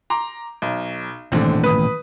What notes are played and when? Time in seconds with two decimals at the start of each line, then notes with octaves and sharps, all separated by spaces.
0.10 A#5 C6 D6
0.62 B1
1.32 D#1 A1 G#2 D3 C4
1.63 B4 D#6